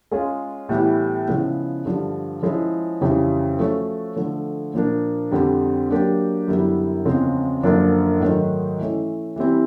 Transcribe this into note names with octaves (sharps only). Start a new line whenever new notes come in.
G#3 C#4 F4 G#4
A2 E3 G3 B3
C#3 F3 G#3 B3 E4
G2 D3 F3
F3 G#3 C#4 E4
F2 C#3 E3 G3
F3 A3 C#4 F#4
D3 F3 A3
A#2 F3 A#3 D4
F2 D3 G3 C4
F#3 A#3 D4 G4
F#2 D3 G3 B3 E4
E2 C#3 F3 G#3 C4
F#2 D3 F3 A#3 D4
G#2 D#3 F#3 A3
E3 A3 C#4
E3 G3 C4 E4